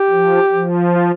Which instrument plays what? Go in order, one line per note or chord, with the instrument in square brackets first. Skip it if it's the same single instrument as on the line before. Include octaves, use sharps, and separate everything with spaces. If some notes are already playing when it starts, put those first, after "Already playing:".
Already playing: [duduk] G4
[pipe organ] F3
F3
[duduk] F4